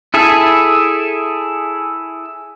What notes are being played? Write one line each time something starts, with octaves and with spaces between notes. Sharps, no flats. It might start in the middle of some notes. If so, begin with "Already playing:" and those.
E4 G#4 A4 E5